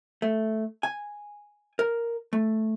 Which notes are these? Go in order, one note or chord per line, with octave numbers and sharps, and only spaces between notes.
A3
G#5
A#4
A3